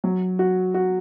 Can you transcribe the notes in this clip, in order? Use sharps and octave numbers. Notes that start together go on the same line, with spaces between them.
F#3
F#4
F#4